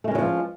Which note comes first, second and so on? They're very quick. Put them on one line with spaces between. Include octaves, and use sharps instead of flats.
A3 G#3 C#4 F#3 F3